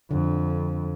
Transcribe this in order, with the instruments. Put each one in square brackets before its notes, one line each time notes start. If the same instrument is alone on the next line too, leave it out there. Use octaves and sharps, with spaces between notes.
[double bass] F2 [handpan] D3